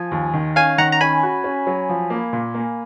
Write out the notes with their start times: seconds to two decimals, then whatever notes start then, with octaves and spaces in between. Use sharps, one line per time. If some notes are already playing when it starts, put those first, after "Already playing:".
Already playing: F3 G#5
0.12 D#2
0.34 D#3
0.56 C#4 F5 G#5
0.78 D#3 F#5 A#5
0.92 A#5
1.01 C#4 G#5 B5
1.23 F#4
1.44 C#4
1.67 F#3
1.89 F3
2.10 A#3
2.33 A#2
2.54 A#3